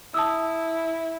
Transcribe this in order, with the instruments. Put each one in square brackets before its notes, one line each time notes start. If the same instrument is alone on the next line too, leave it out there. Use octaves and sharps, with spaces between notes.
[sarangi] E4 [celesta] A5 D#6 E6